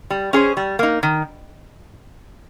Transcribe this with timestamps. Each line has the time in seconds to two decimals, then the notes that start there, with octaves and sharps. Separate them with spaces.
0.10 G3
0.33 C#4 G#4 C5
0.57 G3
0.79 A#3 D#4
1.03 D#3